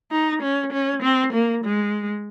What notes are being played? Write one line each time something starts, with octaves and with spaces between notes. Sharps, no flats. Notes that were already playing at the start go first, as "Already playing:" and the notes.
D#4
C#4
C#4
C4
A#3
G#3